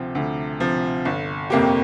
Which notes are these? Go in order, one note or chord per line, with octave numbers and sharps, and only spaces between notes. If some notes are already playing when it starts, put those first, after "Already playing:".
Already playing: D2 C3 F3
D2
C3 F3
G1
F2 C3 A#3 G4